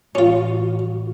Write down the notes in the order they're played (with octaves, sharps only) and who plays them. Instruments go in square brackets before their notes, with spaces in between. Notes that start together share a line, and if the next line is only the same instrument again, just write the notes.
[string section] A1 [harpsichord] C#4 F4 [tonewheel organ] F#4